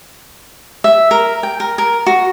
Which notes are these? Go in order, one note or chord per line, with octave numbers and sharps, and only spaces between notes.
E5
A#4
G5
A#4
A#4
F#4